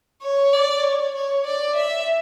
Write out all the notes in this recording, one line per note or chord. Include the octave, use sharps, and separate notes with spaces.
C#5
D5
C#5
C#5
D5
E5